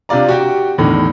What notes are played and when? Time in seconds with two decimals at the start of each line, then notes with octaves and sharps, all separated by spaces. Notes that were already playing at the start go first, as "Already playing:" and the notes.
0.09 C3 D4 F4 D5 A#5
0.29 F#4 G4 G5
0.78 E2 A2 D3 D#3